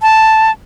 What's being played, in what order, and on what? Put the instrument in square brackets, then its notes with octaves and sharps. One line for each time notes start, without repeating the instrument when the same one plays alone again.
[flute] A5